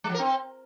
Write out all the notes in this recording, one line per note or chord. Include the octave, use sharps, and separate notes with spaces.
G#3
F3
A#4
C4